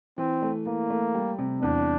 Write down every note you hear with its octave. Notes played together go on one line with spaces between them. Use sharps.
E3 C4
A3
E3 A#3
A3
G3
C3
E2 D4